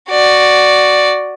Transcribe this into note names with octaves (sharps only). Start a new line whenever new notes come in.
F#4 D5